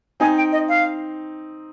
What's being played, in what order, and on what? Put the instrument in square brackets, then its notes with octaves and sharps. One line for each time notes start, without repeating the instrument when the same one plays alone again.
[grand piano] C4 D#4 [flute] G#5
[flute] G5
D#5
F5